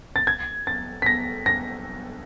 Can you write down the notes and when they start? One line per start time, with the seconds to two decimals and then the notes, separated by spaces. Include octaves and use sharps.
0.16 A6
0.27 G#6
0.67 A6
1.02 B6
1.06 A#6
1.46 A#6